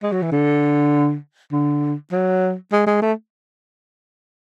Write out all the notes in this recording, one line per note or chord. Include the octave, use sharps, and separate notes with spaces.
G#3
F#3
E3
D3
D3
F#3
G#3
G#3
A3